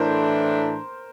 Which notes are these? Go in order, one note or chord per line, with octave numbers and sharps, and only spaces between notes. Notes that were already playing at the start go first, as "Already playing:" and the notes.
Already playing: A2 E3 A3 D4 A#4 C5